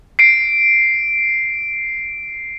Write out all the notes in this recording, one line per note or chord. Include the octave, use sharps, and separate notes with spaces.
C7 D7